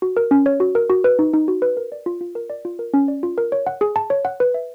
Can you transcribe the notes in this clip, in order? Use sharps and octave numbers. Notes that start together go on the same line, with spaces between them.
F#4
A#4
C#4
C#5
F#4
A#4
F#4
B4
D#4
D#4
F#4
B4
A#4
D5
F4
F4
A#4
D5
F4
A#4
C#4
D5
F4
A#4
C#5
F#5
G#4
A5
C#5
F#5
B4
E5